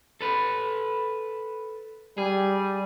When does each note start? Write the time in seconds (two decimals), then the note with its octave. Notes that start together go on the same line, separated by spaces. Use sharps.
0.21 A4 B4
2.18 G3 G#4